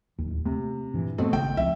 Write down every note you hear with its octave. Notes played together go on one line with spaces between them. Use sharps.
D1 D#2
C3 A3
G2 A#2 E3
B2 A3 C4
G#1 C#3 G5
C#2 F3 C4 E5